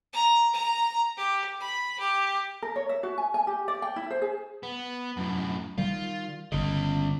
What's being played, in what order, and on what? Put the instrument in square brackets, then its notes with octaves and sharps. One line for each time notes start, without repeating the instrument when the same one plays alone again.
[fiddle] A#5
A#5
G4
B5
G4
[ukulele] A#4
C#5
E5
F#4
G#5
G#5
G4
D5
G5
E4
C5
G#4
[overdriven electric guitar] B3
F#2 A2
[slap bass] D#3 G3 [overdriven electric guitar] F4
[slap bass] G1 C#3 [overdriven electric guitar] C#4 D#5